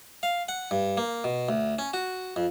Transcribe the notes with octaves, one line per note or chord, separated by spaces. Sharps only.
F5
F#5
G2
A#3
B2
D2
C#4
F#4
F2